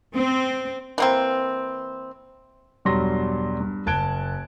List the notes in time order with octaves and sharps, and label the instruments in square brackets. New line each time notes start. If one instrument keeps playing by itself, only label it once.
[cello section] C4
[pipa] E3 A#3 C4
[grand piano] E1 G2 F#3 G3 C6 A#6
G2
F#1 A5 F#6 G#6 D7 G7